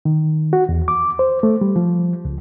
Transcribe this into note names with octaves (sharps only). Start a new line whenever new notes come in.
D#3
F#4
E2
D6
C5
A3
G3
F3
C#2